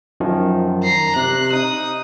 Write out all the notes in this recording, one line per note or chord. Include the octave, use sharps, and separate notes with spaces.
F#2 D#3 F3
A#5 C7
C3 F#6
D#4 D#6